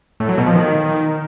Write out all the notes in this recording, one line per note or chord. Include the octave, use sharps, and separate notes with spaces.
A2
F#3
B2
F3
D#3